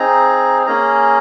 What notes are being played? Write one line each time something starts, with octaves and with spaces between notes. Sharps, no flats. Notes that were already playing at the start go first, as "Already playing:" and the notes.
Already playing: C4 D#4 G#4 A#5
A#3 C#4 G#4 A#5